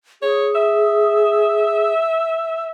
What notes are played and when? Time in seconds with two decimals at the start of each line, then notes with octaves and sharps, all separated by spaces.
0.22 G#4 C#5
0.55 E5